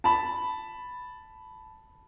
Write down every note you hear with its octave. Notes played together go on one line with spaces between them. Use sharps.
A5 B5